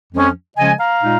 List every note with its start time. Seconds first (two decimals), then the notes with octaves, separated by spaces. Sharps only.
0.13 F2 F3 G#3 C#4
0.57 C#3 F3 G#3 C#4 D#5 G#5
0.79 F5 A#5
1.02 A#2 G#3 D#4